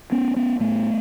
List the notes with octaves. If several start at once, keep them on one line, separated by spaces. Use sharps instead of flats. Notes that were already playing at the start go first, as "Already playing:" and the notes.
B3 C#4
B3 C#4
A2 A3 B3